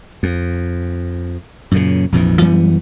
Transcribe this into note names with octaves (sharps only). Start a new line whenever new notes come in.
F2
F#2 A#2 C#3
A#1 F2 G#2 E3
F#2 E3 G3 B3